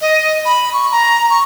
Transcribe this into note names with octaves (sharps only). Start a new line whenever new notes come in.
D#5
B5
C#6
A#5
C#6